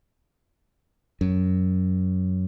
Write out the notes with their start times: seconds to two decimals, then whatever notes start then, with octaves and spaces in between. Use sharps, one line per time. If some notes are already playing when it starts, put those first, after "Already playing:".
1.21 F#2